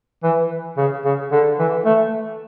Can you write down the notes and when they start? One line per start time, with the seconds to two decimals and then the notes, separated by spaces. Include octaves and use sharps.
0.23 E3
0.77 C#3
1.05 C#3
1.32 D3
1.59 E3
1.86 A3